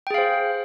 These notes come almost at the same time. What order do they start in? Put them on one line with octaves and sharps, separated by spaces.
G5 G#4 F5 C5